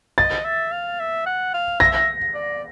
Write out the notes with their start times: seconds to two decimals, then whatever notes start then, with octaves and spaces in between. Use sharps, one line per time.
0.18 D#5 A6
0.44 E5
0.72 F5
1.00 E5
1.26 F#5
1.54 F5
1.80 E5 A#6
2.34 D5